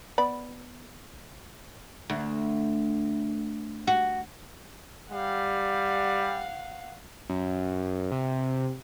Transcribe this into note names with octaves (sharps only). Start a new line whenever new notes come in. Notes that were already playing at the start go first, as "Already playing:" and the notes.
B3 D5 B5
D2
F#4
G3 F5 F#5
F#2
C3